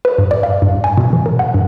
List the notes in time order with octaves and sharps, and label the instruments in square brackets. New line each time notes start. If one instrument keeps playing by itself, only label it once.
[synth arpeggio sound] B4
G2
D5
F5
G2
G#5
B2
E3
A#4
F#5
G2